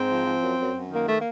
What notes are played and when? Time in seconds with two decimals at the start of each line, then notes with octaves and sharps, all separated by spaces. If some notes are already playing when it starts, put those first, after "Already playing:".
Already playing: G#2 C4
0.09 F3
0.26 F3
0.42 F#2
0.59 F#2
0.75 F#2
0.92 D#3 A#3
1.04 A3
1.16 A#3